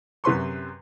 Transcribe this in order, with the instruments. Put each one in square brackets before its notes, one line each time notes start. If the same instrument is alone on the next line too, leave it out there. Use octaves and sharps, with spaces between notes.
[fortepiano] F#2 C3 B4 C6 C#6